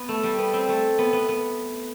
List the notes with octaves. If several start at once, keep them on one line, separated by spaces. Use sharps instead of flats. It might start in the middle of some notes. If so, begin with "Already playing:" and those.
Already playing: B3
A3
G3
B3
C4
A3
B3
B3
B3